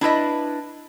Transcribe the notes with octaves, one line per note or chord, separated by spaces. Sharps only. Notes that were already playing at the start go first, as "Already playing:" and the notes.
D4 E4 B4 D#5